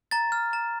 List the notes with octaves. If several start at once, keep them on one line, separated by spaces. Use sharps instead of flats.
A#5 A6
F6
A#5